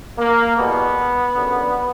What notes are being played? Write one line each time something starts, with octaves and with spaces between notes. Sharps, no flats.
A#3
E2 B2 G3 B3
F#2 D3 G3